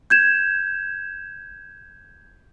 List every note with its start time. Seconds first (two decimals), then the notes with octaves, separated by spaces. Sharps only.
0.10 G6 G#6 E7